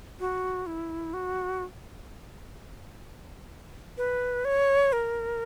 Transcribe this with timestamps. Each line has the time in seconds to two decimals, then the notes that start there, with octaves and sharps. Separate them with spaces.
0.20 F#4
0.66 E4
1.14 F#4
3.98 B4
4.45 C#5
4.93 A#4